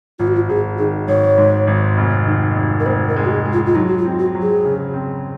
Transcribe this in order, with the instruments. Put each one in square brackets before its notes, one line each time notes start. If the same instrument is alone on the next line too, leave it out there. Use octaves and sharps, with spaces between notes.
[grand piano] G#1 [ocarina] F4
[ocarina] F#4
F4
[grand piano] G#1 [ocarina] G#4
[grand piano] D#3 [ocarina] G#4
[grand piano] G#1 [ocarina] C#5
[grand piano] G#2
G#1
F1
D#3
F1
[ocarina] A#4
[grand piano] F1 [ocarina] C5
[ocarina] A#4
[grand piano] G#3
[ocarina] F#4
G#4
[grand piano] G#3
[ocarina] F4
F4
[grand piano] F#3 [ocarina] D#4
[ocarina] F#4
F4
[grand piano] C4
[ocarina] F#4
[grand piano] F#3
[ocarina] G#4
[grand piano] C#3
C4